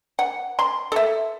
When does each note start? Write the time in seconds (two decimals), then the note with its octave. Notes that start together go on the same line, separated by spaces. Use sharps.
0.19 F#5
0.59 C6
0.92 A4 E5